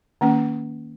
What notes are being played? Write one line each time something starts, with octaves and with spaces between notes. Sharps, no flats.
D#3 A#3 C#4